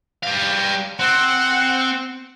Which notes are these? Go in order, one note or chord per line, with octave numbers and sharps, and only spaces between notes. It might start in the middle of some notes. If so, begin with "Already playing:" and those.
G3 F5
C4 F#5